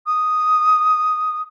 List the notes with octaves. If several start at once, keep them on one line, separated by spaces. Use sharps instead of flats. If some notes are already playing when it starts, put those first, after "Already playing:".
D#6